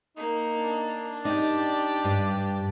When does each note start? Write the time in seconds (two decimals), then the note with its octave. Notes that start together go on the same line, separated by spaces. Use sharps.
0.17 A#3 D#4
0.57 D4
1.25 D#4 G4 D5
2.04 G2